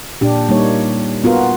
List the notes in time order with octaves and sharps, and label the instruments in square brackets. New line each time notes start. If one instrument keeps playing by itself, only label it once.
[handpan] A#2 D4 G4
G3 A#3 D#4 C#5
B3 F4 F#4 A#4